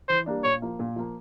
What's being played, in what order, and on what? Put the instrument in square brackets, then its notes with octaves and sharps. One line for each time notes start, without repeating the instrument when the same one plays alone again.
[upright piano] E3 [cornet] C5
[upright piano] G3 A#3 D4
[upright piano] A#2 [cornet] C#5
[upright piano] F3 A#3
A#2
F3 A#3